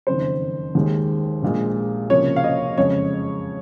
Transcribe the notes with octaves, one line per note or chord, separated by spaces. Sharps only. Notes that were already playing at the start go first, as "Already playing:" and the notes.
F#1 F2 D#3 C5
D#2 D#3 G#3
A#1 A#2 G#3
C#2 C3 F3 A#3 C#5
F5
D#5
F#1 F2 C#3 G#3 C#5